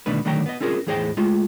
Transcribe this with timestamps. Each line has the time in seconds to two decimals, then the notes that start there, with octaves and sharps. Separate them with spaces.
0.06 B2 D3 D#3 A3 D4 B4
0.25 D3 D#3 F#3 A3 G5 A#5
0.46 B3 D#5
0.61 C4 C#4 F4 G#4 A#4
0.87 E2 A2 G#4 C5 D#5 G5
1.17 G#3 A3 F4